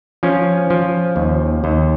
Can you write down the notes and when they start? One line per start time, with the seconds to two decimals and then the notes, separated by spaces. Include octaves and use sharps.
0.23 F3 C#4
0.70 F3
1.16 D#2
1.64 D#2